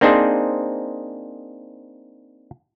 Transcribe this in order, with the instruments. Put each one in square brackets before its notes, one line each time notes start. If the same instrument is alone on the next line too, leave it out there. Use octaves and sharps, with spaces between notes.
[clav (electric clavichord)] A#3 C4 D4 D#4 G#4 C5